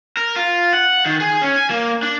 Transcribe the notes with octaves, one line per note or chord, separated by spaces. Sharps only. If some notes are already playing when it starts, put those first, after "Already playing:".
A#4
F4
F#5
D#3
G#4
C#4
G#5
A#3
D4